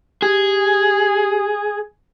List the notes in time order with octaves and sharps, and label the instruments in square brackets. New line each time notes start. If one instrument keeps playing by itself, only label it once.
[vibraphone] G4 [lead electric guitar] G#4